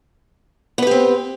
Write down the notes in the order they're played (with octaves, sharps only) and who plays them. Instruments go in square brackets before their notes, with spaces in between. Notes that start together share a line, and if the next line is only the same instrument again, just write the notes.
[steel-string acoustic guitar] B3
B4
G4
C4